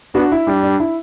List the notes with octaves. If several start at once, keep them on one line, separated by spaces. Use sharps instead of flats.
B3 D4 F#4
E4
G3 D4
D4
E4